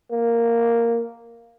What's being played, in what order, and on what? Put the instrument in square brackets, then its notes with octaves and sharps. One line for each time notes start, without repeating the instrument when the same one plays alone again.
[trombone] A#3